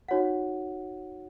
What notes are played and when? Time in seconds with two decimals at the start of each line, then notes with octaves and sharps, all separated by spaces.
0.08 D#4 F#4 C#5 F#5